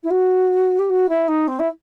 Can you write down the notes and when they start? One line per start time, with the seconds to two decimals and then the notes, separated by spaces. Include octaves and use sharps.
0.03 E4
0.10 F#4
0.79 G4
0.89 F#4
1.09 E4
1.28 D#4
1.47 C4
1.59 E4